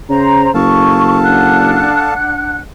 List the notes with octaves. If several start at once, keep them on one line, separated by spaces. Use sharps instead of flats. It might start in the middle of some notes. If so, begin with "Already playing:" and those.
C#3 C5 A#5
F#1 A4 F5 A5 C#6
D4 F#5 F#6